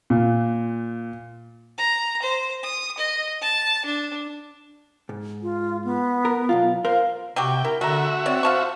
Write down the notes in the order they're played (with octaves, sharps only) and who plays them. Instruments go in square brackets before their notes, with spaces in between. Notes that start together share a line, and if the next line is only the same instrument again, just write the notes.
[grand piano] A#2
[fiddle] A#5
C5
D#6
D#5
A5
D4
[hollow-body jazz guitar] G#2
[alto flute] F4
B3
[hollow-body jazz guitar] A#4
B1 E2 F4
[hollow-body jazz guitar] A#4 C5 [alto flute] F5
[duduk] C3 [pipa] F#3 F#4 G4 [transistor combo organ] G5
[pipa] E4 [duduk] A#4
[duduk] D3 [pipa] A3 A#5 [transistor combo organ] F#4 E5
[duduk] C4 [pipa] C#5 D5
[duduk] C5 [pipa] F5 A5 C#6